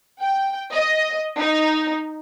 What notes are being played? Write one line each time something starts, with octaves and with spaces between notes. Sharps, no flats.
G5
D#5
D#4